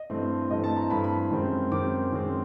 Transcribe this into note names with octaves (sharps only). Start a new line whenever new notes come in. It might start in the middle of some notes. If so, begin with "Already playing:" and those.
Already playing: D#5
G2 E3 A3 C4
G2 E3 A3 C4 D#5
A5
A#5
G2 E3 A3 C4 B5
B5
F#2 D#3 G#3 C4
F#2 D#3 G#3 C4 D6
F#2 D#3 G#3 C4